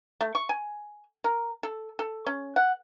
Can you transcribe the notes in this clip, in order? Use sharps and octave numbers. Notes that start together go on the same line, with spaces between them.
A3
C#6
G#5
A#4
A4
A4
C#4
F#5